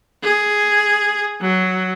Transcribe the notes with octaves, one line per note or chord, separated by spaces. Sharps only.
G#4
F#3